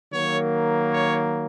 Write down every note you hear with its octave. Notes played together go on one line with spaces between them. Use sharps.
D#3 F#3 A#3 C#5
C#5